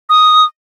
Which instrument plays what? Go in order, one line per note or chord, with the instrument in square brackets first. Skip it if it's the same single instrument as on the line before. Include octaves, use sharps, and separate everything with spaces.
[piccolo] D#6